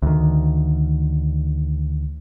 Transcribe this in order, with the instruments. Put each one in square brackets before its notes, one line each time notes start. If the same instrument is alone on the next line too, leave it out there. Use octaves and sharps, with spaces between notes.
[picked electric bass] D2 D#3